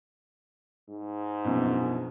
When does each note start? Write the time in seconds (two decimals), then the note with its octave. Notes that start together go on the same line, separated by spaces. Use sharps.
0.89 G#2
1.45 A#1 F#2 B2